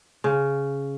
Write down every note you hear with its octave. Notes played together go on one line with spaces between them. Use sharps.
C#3